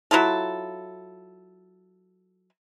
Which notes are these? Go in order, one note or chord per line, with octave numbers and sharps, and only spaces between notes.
F#3 E4 F4 A4